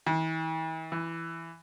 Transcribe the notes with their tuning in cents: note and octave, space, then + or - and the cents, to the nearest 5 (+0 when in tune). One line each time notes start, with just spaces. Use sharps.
E3 -40
E3 +10